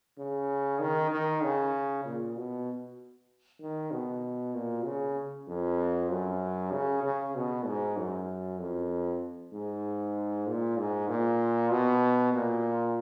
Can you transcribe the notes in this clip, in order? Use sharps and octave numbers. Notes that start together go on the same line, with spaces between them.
C#3
D#3
D#3
C#3
A#2
B2
D#3
B2
A#2
C#3
F2
F#2
C#3
C#3
B2
G#2
F#2
F2
G#2
A#2
G#2
A#2
B2
A#2